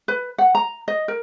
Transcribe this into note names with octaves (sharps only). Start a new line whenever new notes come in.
B4
F#5
A#5
D#5
A#4